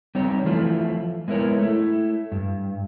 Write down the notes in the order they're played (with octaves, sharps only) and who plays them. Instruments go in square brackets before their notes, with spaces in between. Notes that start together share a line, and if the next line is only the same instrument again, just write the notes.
[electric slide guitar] G3 C4 D#4 C#5
E3 F3 A3 E4 F4
G#3 B3 E4 A#4 C#5
A3 E4
G2